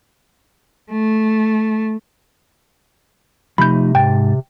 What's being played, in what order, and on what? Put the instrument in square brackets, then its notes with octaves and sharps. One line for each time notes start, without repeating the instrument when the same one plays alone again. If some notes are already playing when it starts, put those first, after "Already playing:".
[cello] A3
[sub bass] C3 [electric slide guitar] F3 A3 D#4 [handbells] B5 G6
[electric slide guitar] G#2 A5 [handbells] G5